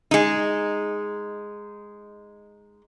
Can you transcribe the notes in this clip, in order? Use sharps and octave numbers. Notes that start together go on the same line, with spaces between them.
G#3 D#4